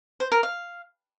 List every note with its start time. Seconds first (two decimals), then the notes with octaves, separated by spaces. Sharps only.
0.20 C5
0.32 A#4
0.43 F5